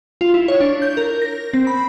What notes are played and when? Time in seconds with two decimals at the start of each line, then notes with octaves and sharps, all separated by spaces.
0.21 F4
0.34 E4
0.48 C#5
0.61 D4
0.82 G6
0.97 A#4
1.22 A#6
1.53 C4
1.67 B5